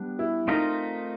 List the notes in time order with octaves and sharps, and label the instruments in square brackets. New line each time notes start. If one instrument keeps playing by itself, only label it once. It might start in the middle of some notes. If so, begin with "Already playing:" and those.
Already playing: [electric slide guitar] G3 B3 D4
[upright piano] E4
[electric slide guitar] A3 C4 F4 A#4 D#5 [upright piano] D#4